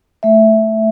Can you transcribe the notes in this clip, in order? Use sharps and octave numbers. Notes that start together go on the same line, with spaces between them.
A3 E5